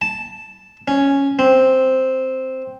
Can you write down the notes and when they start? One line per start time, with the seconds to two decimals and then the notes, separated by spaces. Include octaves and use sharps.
0.01 A5
0.88 C#4
1.39 C4